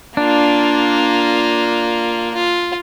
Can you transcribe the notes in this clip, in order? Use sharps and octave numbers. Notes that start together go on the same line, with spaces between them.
A#3 D4 F4
F4